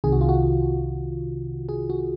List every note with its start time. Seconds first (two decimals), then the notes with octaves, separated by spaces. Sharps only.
0.04 C2 C3 D#3 G#4
0.12 F#4
0.21 F4
0.29 F#4
1.69 G#4
1.90 F#4